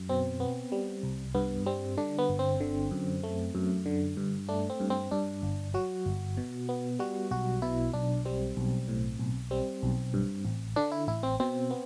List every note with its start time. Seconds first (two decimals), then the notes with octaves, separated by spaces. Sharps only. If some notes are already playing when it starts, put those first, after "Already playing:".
Already playing: F#2
0.09 B2 C4
0.40 B3
0.72 G3
1.03 C2
1.34 G2 B3
1.66 G3 C4
1.97 D3 D4
2.18 B3
2.29 G1
2.39 C4
2.60 D3
2.91 F#2
3.23 A3
3.55 F#2
3.86 D3
4.17 G2
4.48 A3 D4
4.70 C4
4.80 G2
4.90 C4
5.11 G2 D4
5.43 G1
5.74 F#3 F#4
6.06 G1
6.37 B2
6.69 B3
6.99 G3 F#4
7.31 B1 F#4
7.62 B2 E4
7.93 B1 D4
8.25 G3 C4
8.57 B1
8.88 A2
9.19 B1
9.51 G3 C4
9.83 B1
10.14 G2
10.45 A1
10.76 D3 D4
10.92 E4
11.07 A1 E4
11.23 C4
11.40 B2 C4
11.71 B3